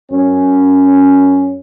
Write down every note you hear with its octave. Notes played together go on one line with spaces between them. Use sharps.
F#2 C#4